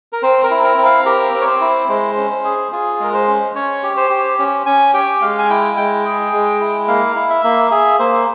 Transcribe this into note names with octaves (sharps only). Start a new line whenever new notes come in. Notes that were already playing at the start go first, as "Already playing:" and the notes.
A#4
C4 C5
A#4
E4
A#4
C4
F5
G4 A#4
C4
C#5
C5
E4
G#3 C5
C#4
C5
G#4
F4 G#4
G#3 A#4
C5
C#4
C#4 C#5
G4
C5
G4
C#4
C#4 G#5
G4 G5
G#3 F5
G#5
E4 G5
G#3 G5
G#4
G#3
E4
A#3 F5
E4
E5
A#3
G#4 E5
A#3 C5